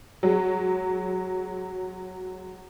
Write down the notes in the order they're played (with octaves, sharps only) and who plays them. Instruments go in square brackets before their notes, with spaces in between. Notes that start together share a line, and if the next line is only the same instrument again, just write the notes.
[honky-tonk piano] F#3 G#3